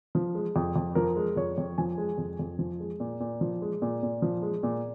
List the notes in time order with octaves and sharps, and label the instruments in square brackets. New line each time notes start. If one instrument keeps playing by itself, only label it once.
[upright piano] F3
G#3
F2
F2
F3 A#4
G#3
F2 C#5
F2
F3 G#5
G#3
F2
F2
F3
G#3
A#2
A#2
F3
G#3
A#2
A#2
F3
G#3
A#2